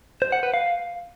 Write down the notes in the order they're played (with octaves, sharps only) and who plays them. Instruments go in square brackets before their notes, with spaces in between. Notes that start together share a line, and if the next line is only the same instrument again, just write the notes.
[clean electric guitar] C5
F#5
B4
F5